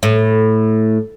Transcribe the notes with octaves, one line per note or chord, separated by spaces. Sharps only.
A2